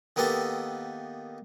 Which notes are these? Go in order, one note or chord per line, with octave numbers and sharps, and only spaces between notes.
D#3 A#3 B3 G4 A4